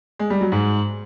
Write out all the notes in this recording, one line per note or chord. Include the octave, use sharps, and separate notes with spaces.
G#3
G3
F#3
G#2